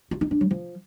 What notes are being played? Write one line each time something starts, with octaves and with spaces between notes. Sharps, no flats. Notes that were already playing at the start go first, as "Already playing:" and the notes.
F4
D#4
D4
F#3
F3